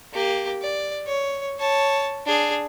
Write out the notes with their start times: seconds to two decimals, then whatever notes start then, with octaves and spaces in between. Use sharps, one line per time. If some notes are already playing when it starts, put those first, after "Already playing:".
0.13 A#3 G4
0.62 D5
1.06 C#5
1.59 C#5 A5
2.26 D4 G#4